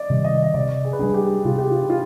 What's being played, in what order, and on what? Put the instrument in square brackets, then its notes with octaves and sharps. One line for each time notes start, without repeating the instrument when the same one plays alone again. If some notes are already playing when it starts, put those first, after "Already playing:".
Already playing: [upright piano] D5 D#5
[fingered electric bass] C3 D#3 G3
[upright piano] D#5
D#5
[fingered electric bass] C3 [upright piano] D5
[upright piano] G#4
B4
[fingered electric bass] G3 B3 D4 [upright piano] G#4
[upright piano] G4
[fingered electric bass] C3 [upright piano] F4
[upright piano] G4
F4
F4